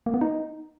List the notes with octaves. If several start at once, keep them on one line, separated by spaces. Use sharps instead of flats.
A#3
B3
D#4